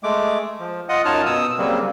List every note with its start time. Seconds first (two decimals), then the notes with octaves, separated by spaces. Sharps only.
0.03 G#3 A3 D6
0.60 F3
0.89 F4 D#5 F#5 D#6
1.05 F#2 D#4 F4 C#5 A5 F6
1.26 B2 D#6 E6
1.58 C#3 F#3 G3 A#3 C4